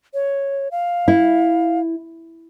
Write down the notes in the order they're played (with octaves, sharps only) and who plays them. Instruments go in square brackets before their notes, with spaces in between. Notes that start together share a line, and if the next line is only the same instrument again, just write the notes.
[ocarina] C#5
F5
[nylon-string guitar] E4